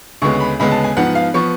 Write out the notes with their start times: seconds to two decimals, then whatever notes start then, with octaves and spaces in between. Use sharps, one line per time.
0.22 D2 C#3 G#3 B3 C#6
0.40 B5
0.60 D2 C#3 G#3 B3 B5
0.71 A5
0.84 G#5
0.97 G#2 F3 B3 F#5
1.15 F5
1.34 F3 B3 C#6